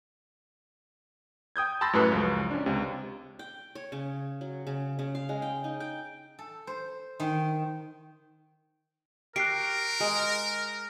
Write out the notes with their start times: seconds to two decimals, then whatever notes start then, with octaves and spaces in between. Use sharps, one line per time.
1.56 G5 D#6 G6 G#6
1.81 A5 B5 C6 E6 A6 A#6
1.93 F#2 A2 G4 B4 F#6 C#7
2.12 C#2 F#2 F3
2.51 C#4 D4
2.66 C#2 C3
3.39 G5
3.75 C#5
3.92 C#3
4.41 F#3
4.67 C#3
4.99 C#3
5.15 F5
5.29 G#3
5.42 G5
5.64 D#4
5.80 G5
6.39 A4
6.67 C5
7.20 D#3
9.36 G4 A#4 C#6 F#6 C7 D7
10.00 G#3